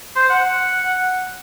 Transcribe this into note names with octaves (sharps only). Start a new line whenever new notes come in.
C5
F#5